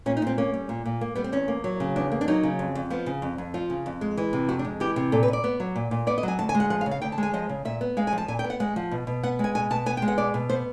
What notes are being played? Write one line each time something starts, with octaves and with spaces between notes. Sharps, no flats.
A#2 C#4
D#4
A#2 C4
A#3 C#4
G3
A#2
A#2
A#3
G3 B3
C4
E2 C#4
A#3
F#3
C#3
E2 D4
A#3
D4
F#3 D#4
C#3
F2
F2
F3 B3
C#3
F2
F2
F3 F4
C#3
F2
G#3
E3
C3
F2 F#4
D4
G#3
E3 G4
C3
A#2 A4
B4
A#2
D5
B3
F#3
A#2
A#2
B3 D5
D#5
F#3 G#5
D2 A5
G#5
G#3
F#5
F3 F#5
F5
C#3
F5
D2 G5
A5
G#3 G#5
F3 D#5
C#3
A#2 E5
B3
G#3 F5
G#5
F3
A5
A#2 G#5
G5
B3
F#5
G#3 F#5
F3
B2
B2
B3 F#5
G#3 G#5
B2 G#5
B2 A5
B3 G#5
G5
G#3
F#5
B2 D5
B2
B3 C5